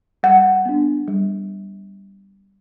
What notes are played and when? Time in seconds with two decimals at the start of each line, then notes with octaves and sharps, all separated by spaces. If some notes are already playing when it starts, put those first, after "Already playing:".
0.23 G3 F#5
0.65 B3 D4
1.08 G3